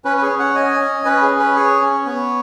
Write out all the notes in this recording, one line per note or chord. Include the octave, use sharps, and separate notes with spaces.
C#4 B4
B4
G#4 C#5
C#4
C#5 F#5
C#4 D#5 G#5
C#4
C#4 B4
G#4
C#4
B4
G#4 C#5
C#4
B3